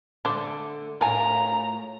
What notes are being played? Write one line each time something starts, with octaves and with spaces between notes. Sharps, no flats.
D3 A3 D4 C5
A2 F4 A#4 F5 G#5 A#5